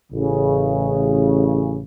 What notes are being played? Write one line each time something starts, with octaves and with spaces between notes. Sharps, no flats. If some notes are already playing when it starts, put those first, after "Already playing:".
A1 C#3